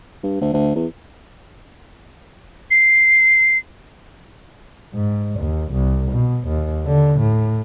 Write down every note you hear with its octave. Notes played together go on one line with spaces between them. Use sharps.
G2
D2
D2
E2
C7
G#2
D#2
C2
B2
D#2
D3
A2